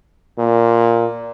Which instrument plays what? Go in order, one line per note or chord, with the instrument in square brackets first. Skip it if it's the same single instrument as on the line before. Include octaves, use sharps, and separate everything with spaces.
[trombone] A#2